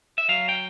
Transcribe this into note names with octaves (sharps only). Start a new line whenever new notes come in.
E5
F#3 F5
G5